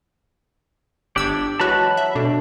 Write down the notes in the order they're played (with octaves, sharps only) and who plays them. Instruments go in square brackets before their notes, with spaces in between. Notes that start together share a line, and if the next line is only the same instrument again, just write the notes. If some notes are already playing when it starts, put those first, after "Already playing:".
[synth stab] G1 E6 G#6 [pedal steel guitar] D4 G4 D5
[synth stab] E3 G#3 F#4 [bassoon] F#3 [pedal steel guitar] A5 B5 F#6
[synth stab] E5
[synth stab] B2 [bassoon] A3 [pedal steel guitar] D4